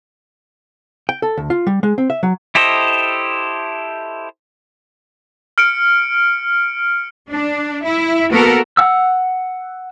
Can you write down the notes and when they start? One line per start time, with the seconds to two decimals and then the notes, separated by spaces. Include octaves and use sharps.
1.09 G5
1.22 A4
1.38 D2
1.50 F4
1.67 G3
1.83 G#3
1.98 C4
2.10 E5
2.23 F#3
2.55 E4 G4 A4 C5 D#5
5.58 F6 C#7 D7
7.30 D4
7.86 E4
8.31 A#3 B3 F#4 A4 A#4
8.77 F#5 E6